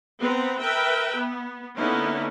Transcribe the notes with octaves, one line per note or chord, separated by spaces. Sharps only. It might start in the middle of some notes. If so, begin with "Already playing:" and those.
B3 C4 B4 A#5
A#4 B4 E5 G5
B3
D3 A#3 B3 C#4 D#4 E4